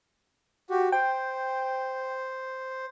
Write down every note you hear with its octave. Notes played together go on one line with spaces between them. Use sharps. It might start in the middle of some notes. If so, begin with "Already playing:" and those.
F#4 G4
C5 G5